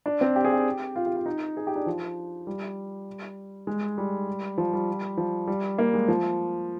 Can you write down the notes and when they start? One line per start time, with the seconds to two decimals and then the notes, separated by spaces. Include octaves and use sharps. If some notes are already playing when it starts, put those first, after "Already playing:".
0.06 D4
0.21 C4
0.36 G4
0.45 G#4
0.53 G4
0.96 F4
1.06 G4
1.16 F4
1.26 D#4
1.57 G#4
1.67 G4
1.76 D4
1.86 F3
2.47 G3
3.67 G#3
3.98 G3
4.58 F3
4.73 G3
5.17 F3
5.47 G3
5.78 A#3
5.94 G#3
6.08 F3